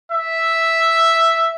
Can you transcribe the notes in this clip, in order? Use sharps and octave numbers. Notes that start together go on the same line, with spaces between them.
E5